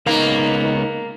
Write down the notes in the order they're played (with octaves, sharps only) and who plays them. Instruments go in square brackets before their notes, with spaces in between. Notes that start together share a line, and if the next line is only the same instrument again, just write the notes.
[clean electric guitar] C#2 B3 A#5 [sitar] A#3 [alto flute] D#4